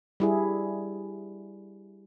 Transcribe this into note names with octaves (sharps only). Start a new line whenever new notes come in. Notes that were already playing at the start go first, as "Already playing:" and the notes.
G3 E4 G#4